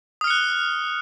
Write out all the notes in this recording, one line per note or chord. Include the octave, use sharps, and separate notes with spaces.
D#6 F6 F#6 C#7